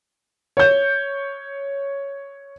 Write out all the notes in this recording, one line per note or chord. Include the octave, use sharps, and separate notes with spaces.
C#5 G6